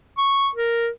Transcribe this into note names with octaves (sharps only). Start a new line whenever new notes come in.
C#6
A#4